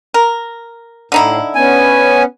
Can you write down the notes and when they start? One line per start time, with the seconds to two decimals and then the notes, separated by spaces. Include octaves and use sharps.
0.14 A#4
1.12 A2 D3 D#4 E4
1.55 B3 C#4 G#5